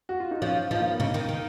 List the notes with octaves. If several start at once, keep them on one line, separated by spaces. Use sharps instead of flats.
F#4
F4
D#4
F3 C#4
F3 D#4
A#3
B3
C#3 D#4
D#3
D#3